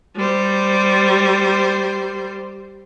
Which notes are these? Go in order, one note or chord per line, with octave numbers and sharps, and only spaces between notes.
G3 C5